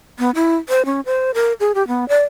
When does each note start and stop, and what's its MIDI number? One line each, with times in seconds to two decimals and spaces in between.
0.19 0.30 59
0.35 0.56 64
0.69 0.85 72
0.85 1.01 61
1.06 1.34 72
1.34 1.53 70
1.60 1.72 68
1.75 1.86 67
1.88 2.08 59
2.09 2.24 74